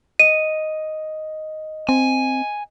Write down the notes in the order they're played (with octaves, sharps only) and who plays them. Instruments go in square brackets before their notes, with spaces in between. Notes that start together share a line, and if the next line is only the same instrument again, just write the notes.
[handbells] D#5 [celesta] D#7
[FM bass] C4 [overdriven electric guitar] G#5